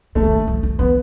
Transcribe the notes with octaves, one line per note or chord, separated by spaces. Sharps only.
E3 A3
F#3
F3
F#3
F3
F3
F3 B3